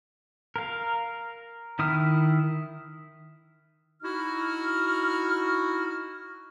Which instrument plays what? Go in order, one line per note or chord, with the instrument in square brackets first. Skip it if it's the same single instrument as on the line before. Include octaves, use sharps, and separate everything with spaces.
[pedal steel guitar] A#4 F5
D#3 E4 D#6 F6
[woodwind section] D#4 E4 F#4 F6